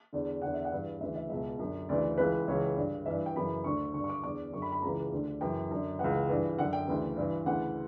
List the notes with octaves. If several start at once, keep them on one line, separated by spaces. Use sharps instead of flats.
E2 D3
E2 D3 F#5
E5
F#5
G2 E3
D2 C#3 E3 E5
E5
C#2 B2 E5
F#2 D3
D2 C#3 E3 D5
C#2 C#3 E3 B4
C#2 C#3 E3 C#5
G2 D3
G2 E3 E5
G5
F#2 C#3 E3 B5
D2 D3 C#6
G2 D3 C#6
C#6
D6
E2 D3 D6
F#2 D3 C#6
B5
B5
C#2 C#3 E3 A#5
D2 D3
F#2 C#3 E3 G5
F#2 D3
C#2 C#3 E3 F#5
G2 E3
F#2 D3 F#5
G5
D2 C#3 E3
G2 E3
D2 C#3 E3 F#5